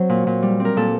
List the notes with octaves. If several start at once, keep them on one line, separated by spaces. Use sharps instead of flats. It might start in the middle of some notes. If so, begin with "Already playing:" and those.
Already playing: F#3 C4 C5
A#2
A#2
G3
C4
A#4
A#2 A4